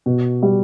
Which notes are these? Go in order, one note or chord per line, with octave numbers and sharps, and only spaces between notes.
B2
G3